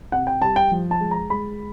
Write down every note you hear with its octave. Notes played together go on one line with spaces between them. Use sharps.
C3 F#5
G5
G3 A5
G5
F3
A5
G#3
A#5
G#3 B5